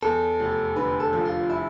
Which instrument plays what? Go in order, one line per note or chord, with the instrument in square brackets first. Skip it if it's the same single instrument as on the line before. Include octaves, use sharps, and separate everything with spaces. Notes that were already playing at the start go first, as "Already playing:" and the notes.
[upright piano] E2 [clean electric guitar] A4
[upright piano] F1
[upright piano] D3 [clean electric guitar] B4
[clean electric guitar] A4
[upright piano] F3
[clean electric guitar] F4
E4